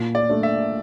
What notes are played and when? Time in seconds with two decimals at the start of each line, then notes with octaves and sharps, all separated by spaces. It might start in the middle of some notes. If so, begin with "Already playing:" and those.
Already playing: A#2
0.15 D5
0.29 A3 D4
0.43 E5